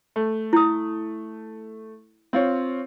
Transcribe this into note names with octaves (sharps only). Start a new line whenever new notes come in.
A3
E4 D#6
C4 F4 C#5